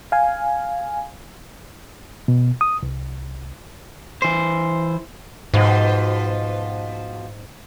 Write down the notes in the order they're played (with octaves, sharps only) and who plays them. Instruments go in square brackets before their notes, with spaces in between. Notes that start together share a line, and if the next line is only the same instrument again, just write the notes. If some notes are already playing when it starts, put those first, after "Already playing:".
[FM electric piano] F5 G#5
[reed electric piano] B2
D#6
C2
[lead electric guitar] E3 C5
[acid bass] G#2 [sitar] B2 F3